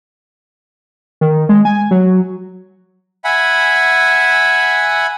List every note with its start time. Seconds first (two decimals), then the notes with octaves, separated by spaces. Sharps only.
1.21 D#3
1.49 G#3
1.65 G#5
1.91 F#3
3.24 E5 F#5 G#5 B5